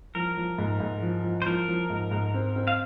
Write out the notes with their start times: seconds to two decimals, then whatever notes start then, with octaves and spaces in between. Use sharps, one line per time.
0.15 F3 A#4
0.37 F3
0.58 G#2
0.80 G#2
1.02 F3
1.24 F3
1.42 C5
1.46 F3 A#4
1.68 F3
1.90 G#2
2.11 G#2
2.34 C4
2.56 C4
2.67 F5